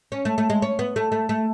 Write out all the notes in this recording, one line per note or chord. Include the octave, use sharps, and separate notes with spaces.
C#4
A3
A3
G#3
C#4
B3
A3
A3
A3